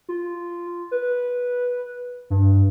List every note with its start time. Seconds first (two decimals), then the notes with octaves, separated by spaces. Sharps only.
0.09 F4
0.91 B4
2.30 G2